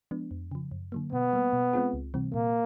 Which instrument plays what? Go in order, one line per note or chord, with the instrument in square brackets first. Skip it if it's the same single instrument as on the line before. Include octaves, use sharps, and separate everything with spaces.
[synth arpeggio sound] F3 G#3 B3 D4
F2
C#3 F3
F#2
D3 F#3 A#3
[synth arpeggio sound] B2 [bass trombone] B3
[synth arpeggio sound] G3 A#3
B2
G#3 C4 F4 G#4
C#2
C3 E3 G3 C4
[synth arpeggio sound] A#2 [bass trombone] A#3